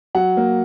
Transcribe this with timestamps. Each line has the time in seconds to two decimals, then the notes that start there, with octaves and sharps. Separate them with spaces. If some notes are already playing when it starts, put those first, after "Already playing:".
0.15 F#3 F#5
0.37 A#3